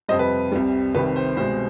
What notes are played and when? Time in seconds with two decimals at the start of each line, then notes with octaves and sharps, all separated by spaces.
0.08 F2 C3 G3 C5 D#5
0.19 B4
0.52 C2 C3 G3
0.95 C2 C3 D#3 G3 B4
1.16 C5
1.37 C2 B2 G#3 C5